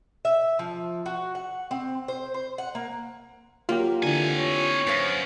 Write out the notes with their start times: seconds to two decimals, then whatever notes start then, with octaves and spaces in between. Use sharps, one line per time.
0.25 E5
0.59 F3
1.06 F#4
1.35 F#5
1.71 C4
2.08 C5
2.34 C5
2.58 F#5
2.75 A#3
3.69 F#3 A#3 F4 G4
4.03 D3 E3 C4 G#5
4.38 C#5
4.87 F#2 B4 C5 F5